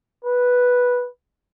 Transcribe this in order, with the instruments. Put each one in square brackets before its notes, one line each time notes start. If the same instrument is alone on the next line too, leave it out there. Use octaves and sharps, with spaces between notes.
[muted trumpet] B4